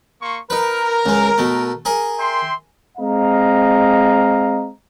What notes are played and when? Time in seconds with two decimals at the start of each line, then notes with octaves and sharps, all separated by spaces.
0.21 A#3 C6 C#6
0.50 D#4 A#4 B4
1.06 C#2 G#3
1.38 B2 A3
1.85 G#4 A#4 D#5
2.18 E5 G5 C6
2.98 G#3 C4 D#5 F5 A#5